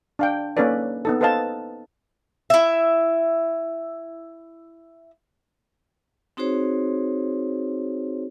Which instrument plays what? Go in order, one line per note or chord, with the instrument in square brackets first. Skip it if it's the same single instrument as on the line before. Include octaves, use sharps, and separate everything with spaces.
[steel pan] D4 F5 G5
A#3 C#4 D#4 A4 B4 D5
B3 D#4 A4
A4 B4 C5 D#5 F5 A5
[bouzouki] E4 E5
[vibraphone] C4 D#4 F#4 G#4 C5 C#5